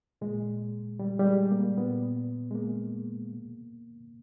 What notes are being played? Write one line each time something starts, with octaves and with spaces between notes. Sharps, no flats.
A#2 G#3
G3
G3
G#3
A#3
A#2 B3
G#3
A#3
B2